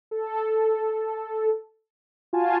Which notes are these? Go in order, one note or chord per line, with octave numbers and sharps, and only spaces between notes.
A4
F4 F#4 G#5 A5